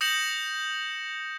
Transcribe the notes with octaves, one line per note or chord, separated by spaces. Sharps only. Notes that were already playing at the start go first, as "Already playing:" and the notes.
D#6 G6 A#6 C#7 E7 F#7